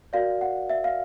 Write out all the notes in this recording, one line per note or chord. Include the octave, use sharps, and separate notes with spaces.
F#4 A#4 D5 F5
F#5
E5
F5